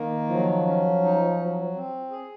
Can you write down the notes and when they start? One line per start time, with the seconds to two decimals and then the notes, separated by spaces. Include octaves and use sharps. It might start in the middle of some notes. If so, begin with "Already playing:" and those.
Already playing: D#3 A#3
0.29 F3 F#3
0.66 C#4
1.03 D#4
1.38 F#3
1.74 C4
2.11 G#4